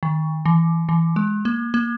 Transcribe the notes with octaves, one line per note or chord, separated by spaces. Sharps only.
D#3
E3
E3
G#3
A#3
A#3